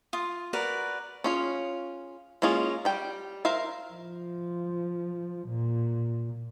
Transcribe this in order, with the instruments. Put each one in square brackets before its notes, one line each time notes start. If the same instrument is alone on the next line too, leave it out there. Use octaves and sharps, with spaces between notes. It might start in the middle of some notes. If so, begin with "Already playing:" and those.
[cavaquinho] F4 D#6
F#4 A#4 B4 D5
[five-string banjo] C#4 F4 G#4
G#3 A#3 C#4 F4 G#4
G3 G5
A#4 C5 E5 F5
[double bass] F3
A#2